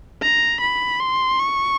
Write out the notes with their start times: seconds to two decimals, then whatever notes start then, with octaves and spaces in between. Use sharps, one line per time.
0.22 A#5
0.61 B5
1.00 C6
1.39 C#6